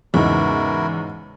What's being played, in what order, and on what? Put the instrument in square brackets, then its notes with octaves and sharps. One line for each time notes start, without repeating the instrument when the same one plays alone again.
[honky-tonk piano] E2 [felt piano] G#2 C#3 D#4 [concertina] E4 F#4 A#4